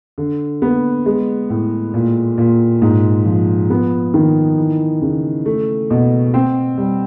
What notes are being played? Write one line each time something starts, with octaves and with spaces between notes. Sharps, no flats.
D3
B3
G#3
A2
A#2
A#2
G#2
F3
B3
D#3
E3
C#3
A3
B2
C4
G3